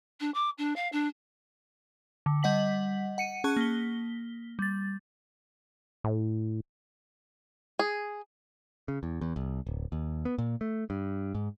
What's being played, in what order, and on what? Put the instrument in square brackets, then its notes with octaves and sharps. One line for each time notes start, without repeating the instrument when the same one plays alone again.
[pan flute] D4
D6
D4
F5
D4
[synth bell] D3
G3 D#5 F#5 B6 F#7
F#5 C#7 D#7
C#4 G#4 A5 C#6 F#6
A#3 B6 G7
G3 A6
[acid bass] A2
[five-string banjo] G#4
[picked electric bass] C#3
E2
E2
C2
D1
D#2
B3
A#2
A3
G2
G#2